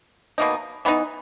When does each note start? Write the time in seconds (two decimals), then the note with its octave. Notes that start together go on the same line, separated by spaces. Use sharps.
0.38 B2 A#3 D#4
0.85 E3 B3 D#4